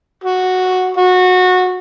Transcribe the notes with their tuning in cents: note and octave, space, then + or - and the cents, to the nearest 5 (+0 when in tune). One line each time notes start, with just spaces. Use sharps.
F#4 -5
F#4 -20